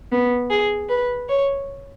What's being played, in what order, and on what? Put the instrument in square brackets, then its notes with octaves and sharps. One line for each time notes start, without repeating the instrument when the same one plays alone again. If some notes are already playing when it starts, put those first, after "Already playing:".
[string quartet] B3
G#4
B4
C#5